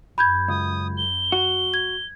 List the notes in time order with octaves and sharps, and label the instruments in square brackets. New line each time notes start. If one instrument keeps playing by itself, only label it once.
[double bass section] F#2 [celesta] B5 G6 G#6
[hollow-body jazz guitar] C#2 [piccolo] D#6
[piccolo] G7
[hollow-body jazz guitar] F#4
[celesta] G#6